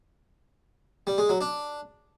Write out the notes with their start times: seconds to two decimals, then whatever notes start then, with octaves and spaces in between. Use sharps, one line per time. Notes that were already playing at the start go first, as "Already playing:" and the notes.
1.07 G3
1.18 G#3
1.29 F#3
1.41 D4